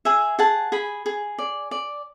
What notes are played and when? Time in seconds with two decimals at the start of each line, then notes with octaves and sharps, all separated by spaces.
0.05 G#4 E5 G#5
0.39 G#4 F#5 A5
0.72 G#4 G#5 B5
1.06 G#4
1.39 D5
1.71 D5